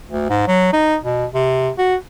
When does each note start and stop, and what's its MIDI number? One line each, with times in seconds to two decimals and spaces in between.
0.10 0.28 38
0.30 0.44 44
0.48 0.73 54
0.73 0.97 63
1.04 1.26 47
1.34 1.70 48
1.78 1.96 66